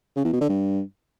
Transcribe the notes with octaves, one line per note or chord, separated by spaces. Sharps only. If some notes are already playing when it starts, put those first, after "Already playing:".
C#3
E2
B2
D3
G2